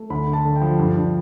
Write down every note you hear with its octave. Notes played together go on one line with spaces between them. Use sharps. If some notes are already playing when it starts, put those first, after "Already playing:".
Already playing: A3
D2 B5
D3
A5
D3
G5
F3
G2
G2